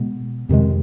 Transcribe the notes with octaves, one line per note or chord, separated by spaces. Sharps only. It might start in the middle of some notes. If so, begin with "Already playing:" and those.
Already playing: B2 G#3 B3
F2 C3 D#3 G#3